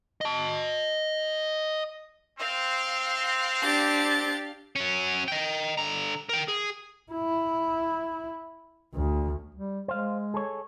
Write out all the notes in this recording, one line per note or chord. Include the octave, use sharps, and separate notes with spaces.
D#5 A5
C4 F5
D4 G4 A6
F#3 C#4
D#5 G5
D3 A#5
A#4 G5
G#4
E4
D2
G3
G#3 C5 F5
G#4 A4 C#5